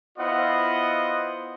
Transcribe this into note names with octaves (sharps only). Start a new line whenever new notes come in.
B3 E4 F4 C5 D#5 F#5